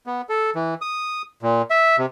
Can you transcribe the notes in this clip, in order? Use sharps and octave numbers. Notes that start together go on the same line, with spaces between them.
B3
A4
E3
D#6
A#2
E5
C3